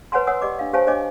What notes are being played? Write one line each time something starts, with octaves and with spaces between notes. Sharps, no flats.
B4 C#5 F#5 G#5 A#5 C6
C#5 F#5 G#5 D#6 E6
G4 D5 D#5 D6
D4 F5
G4 C5 C#5 F5 G#5 A5
D4 C#5 D#5 G#5 D6